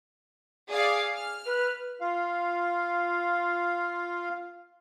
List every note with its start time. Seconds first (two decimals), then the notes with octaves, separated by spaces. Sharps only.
0.68 G#4 D5 F5
1.15 F6
1.46 B4
2.01 F4 F5